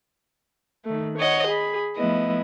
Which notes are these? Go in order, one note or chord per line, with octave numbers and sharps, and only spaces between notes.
D#3 A3
C#5 D#5 F#5
G#4 B5
F3 A3 B3 E4 D#5